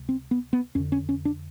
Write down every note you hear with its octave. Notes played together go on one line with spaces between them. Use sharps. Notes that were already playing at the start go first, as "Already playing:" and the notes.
Already playing: C#2 C3
C4
B3
B3
F2 D3 C#4
C#4
C#4
D4